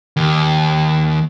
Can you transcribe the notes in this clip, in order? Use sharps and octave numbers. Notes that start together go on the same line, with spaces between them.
D#2